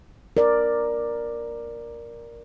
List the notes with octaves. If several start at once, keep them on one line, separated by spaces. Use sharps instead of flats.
A#4 D5